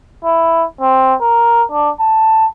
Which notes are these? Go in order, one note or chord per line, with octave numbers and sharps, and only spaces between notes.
E4
C4
A#4
D4
A5